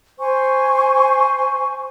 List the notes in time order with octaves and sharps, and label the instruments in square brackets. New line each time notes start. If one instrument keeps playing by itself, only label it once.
[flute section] C5 G#5 C#6